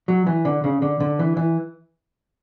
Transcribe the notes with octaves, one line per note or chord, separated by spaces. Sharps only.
F#3
E3
D3
C#3
D3
D3
E3
E3